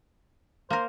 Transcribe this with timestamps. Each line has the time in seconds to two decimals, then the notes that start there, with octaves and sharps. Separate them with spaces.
0.70 A#3 A#4 C5